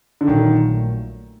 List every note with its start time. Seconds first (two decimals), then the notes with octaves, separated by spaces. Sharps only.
0.21 D3
0.27 A#1 A#2 D#3 F#3 A3